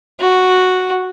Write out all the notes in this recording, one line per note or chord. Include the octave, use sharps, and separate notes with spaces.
F#4